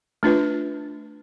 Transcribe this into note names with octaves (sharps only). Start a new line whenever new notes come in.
A3 D4 F4 B4